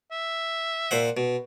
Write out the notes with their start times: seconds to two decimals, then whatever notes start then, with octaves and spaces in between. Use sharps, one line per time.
0.11 E5
0.91 A#2 C5 F#5
1.17 B2